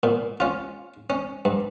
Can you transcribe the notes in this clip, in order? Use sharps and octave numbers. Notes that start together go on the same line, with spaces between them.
A#2
C#4 F4
C#4
G2